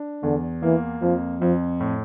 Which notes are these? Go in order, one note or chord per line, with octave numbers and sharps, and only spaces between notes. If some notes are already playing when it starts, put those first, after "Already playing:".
Already playing: D4
E2 D3
E3 A#3
F2 F3
F2 F3
A2